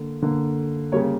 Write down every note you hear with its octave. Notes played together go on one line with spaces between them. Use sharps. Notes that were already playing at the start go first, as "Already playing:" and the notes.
Already playing: D3 A#3
D3 A#3
C#3 G3 A#3 C#5